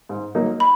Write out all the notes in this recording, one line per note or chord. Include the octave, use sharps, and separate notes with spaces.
G#2
F#3 A#3 D#4
B5